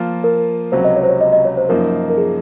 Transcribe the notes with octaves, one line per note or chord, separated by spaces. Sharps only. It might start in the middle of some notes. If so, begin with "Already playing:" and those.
Already playing: F3 A#3 F4
A#4
C#2 C3 F#3 C#4 F#4 C5
D#5
C#5
C5
C#5
D#5
D#5
C#5
C5
F#2 F3 A#3 D#4 A#4
A#4
G#4